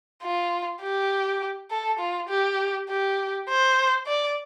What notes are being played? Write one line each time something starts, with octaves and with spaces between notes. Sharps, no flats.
F4
G4
A4
F4
G4
G4
C5
D5